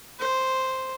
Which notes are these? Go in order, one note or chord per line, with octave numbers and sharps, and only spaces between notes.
C5